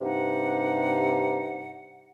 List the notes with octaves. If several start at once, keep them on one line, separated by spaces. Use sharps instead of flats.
G2 C3 D#4 F#5